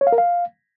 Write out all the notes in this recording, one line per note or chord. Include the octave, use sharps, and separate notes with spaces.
C#5
F5
A#4
F5